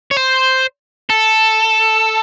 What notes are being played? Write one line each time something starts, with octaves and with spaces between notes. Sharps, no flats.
C#5
C5
A4